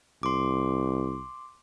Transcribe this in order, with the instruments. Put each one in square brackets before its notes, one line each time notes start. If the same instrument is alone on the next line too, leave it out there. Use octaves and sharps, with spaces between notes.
[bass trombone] C2 [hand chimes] C6 D6